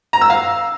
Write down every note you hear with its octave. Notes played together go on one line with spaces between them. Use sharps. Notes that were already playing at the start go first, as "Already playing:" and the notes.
A#5
E6
F5